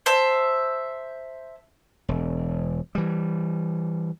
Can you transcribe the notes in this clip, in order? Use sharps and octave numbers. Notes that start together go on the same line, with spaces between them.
C5 E5 A5
E1
E3 G3